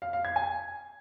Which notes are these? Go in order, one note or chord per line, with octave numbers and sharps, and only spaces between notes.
F5
F5
G#6
G#5